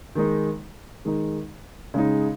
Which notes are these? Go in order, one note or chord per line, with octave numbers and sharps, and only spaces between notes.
D#3 G#3 D#4
D#3 G#3 D#4
C#3 G#3 D#4